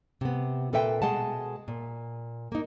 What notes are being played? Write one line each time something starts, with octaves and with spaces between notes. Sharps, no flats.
C3 B3
A#2 A4 B4 E5 G5
B2 G#3 F#5 A5
A#2
A#3 D#4